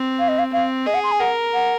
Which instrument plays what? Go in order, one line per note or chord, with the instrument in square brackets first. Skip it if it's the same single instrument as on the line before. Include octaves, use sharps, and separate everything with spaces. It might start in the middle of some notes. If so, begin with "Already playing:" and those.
Already playing: [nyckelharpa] C4
[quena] F5
D#5
F5
[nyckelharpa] C4 [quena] F5
[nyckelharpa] G#4 [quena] D#5
[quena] F#5
C6
G#5
[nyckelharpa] A#4 [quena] F#5
[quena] F#5